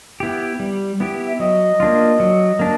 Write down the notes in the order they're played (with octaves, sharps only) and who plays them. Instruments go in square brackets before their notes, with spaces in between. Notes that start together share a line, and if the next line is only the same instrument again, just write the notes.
[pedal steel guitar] B3 E4 G4
G3
B3 E4 G4
[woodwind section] E5
[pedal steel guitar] F#3 [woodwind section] D#5
[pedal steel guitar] A#3 D4 F4
F#3
A#3 D4